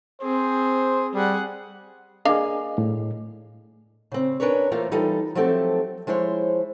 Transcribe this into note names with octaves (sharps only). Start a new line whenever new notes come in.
C4 G#4 C5
G3 G#4 F#5
A#3 D4 G#4 D#5 F5
A2
C#3 C4
C#4 D4 A#4 B4 C#5
E3 A3 A#3 F4 C5
E3 G3 D#4 F4 A4
F3 F#3 A3 C4 G4 A4
F3 G#3 E4 C5 C#5